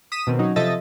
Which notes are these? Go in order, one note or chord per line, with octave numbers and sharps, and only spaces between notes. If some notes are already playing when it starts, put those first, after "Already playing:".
D#6 B6 D#7 E7
B2 D#3 C4
F#3 C#4 D#4
C3 F3 A4 D#5 E5 A6